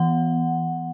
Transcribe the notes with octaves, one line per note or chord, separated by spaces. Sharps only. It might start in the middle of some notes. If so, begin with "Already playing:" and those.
Already playing: E3 B3 F#5